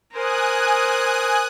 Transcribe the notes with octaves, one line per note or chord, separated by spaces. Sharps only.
A#4 C5 G#5 D#6 F#6